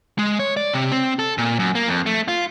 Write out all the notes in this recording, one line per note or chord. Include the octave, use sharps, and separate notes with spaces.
G#3
C#5
D5
C3
C4
A4
A#2
F#2
A#3
F2
A3
F4